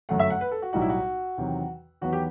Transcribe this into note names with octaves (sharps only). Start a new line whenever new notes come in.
G1 F#2 F#3 A3 F#5
E5
F#5
B4
A4
F#4
B1 A2 G3 D#4 F#4
E4
F#4
E2 C3 D#3 F#3
E2 D#3 F#3 B3 F#4
G4